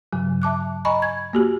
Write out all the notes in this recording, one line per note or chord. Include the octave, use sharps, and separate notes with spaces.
G2 C#3 F#3
E5 A5 D6 F#6
D#5 G#5 A#5 B5 C#6
G#6
A#3 F#4 G4